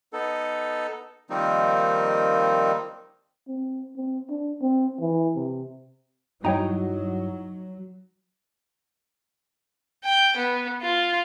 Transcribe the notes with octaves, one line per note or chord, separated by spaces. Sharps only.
B3 D#4 A4
D#3 F3 G3 A#3 C4 D#4
C4
C4
D4
C4
E3
C3
G2 F#3 D#4 E4 F#4 C#5 G5 A#5
G5
B3
F4